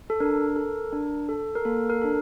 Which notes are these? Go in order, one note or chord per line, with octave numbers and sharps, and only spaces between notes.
A4
D4 A#4
A4
D4
A4
A#4
A#3 A4
A#4
D4 A4